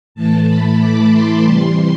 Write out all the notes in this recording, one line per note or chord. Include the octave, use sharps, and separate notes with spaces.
A2 E3 A3 A5
B5
D6
C6
C3 E3 G3 C6